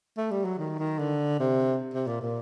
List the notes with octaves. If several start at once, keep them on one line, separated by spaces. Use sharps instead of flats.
A3
G3
F#3
D#3
D#3
D3
C3
C3
A#2
A#2